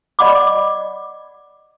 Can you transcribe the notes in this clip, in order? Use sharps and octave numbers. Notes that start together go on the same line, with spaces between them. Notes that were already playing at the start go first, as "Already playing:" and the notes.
D5 D#5 F#5 B5 D6